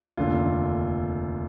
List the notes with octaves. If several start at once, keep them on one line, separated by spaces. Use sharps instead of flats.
F1 D#2 D3 F4